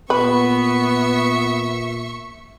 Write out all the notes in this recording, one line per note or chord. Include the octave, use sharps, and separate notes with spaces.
A#2 B3 B4 E5 C#6